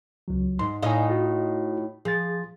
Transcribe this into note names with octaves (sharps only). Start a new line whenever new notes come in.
C#2 F#3
G#2 C6
A2 D#4 D#5 F5 G#5
F4 F#4
F3 G#4 A6